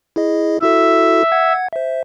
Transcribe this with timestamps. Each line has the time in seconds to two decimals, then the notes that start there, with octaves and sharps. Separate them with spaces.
0.16 E4 G#4 D#5
0.62 E4 F#4 A4 E5
1.32 F#5 G#6
1.73 C5 E5